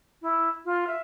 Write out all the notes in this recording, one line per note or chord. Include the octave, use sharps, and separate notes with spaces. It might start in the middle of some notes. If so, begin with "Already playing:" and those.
E4
F4
E5